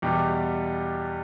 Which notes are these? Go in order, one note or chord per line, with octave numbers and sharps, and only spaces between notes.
E2 B2 G3 G4